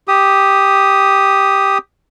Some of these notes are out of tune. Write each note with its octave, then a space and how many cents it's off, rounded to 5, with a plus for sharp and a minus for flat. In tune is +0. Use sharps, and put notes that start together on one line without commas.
G4 +0 D#6 +0